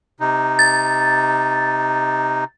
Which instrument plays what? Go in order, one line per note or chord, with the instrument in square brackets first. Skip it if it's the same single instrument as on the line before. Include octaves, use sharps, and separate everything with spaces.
[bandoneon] C3 D#4
[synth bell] A6